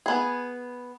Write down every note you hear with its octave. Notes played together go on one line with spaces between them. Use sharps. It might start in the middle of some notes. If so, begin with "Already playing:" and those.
B3 G#4